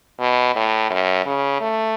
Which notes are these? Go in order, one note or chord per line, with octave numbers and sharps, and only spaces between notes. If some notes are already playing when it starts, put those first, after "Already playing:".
B2
A2
F#2
C#3
A3